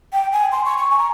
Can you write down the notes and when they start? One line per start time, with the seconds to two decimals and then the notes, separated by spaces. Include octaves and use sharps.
0.13 G5
0.33 G#5
0.52 C6
0.65 C#6
0.78 C#6
0.91 G#5
0.98 A#5